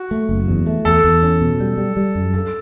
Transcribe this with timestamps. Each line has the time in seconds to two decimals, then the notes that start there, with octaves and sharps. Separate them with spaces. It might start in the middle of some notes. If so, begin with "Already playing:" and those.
Already playing: F#4
0.11 A3
0.29 F#1
0.48 E2
0.67 A3
0.85 E2 A4
1.04 E2
1.23 C#4
1.41 B2
1.60 G3
1.77 G3
1.97 G3
2.15 F#2
2.34 G2 A4